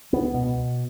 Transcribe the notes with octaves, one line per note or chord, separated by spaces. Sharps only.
C#2 B3
B2